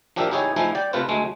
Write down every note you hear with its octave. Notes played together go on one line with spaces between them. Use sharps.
F3 D4 G4 A#4 E5
D#4 E4 G4 G#4 C#5 G#5
F3 A3 D#4 E4 G#4
D5 G5
C3 A3 F4 B4 C5
D2 G#3 A3